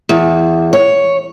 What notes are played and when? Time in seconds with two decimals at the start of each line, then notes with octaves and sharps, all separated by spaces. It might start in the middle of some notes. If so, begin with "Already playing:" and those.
0.09 E2
0.73 C#5